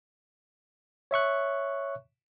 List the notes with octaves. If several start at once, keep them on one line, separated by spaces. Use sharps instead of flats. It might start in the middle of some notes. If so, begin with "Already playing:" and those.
C#5 E5 C#6 F#6